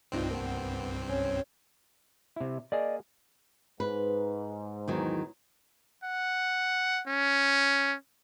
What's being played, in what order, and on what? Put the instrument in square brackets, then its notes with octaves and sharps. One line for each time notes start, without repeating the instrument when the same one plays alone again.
[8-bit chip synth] C2 G2 C4 [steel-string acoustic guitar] D4 D#4 F4
[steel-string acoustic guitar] A#3 B3
C#4
[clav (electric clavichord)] C3 E4
[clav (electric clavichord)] A#3 G#4 [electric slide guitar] D5 D#5
[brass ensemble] G#2 [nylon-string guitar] B4
[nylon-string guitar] E2 D#3 F#3
[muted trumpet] F#5
C#4